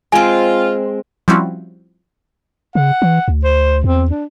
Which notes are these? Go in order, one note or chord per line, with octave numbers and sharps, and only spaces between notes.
G#3 C4 F4 G#5
F3 G3 C4 C#4 E4 F#4
C#3 F#5
E3
D2
C5
E2 C4
D4